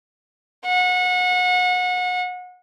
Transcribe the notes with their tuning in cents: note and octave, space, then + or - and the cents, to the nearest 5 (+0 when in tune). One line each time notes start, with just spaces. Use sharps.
F#5 -30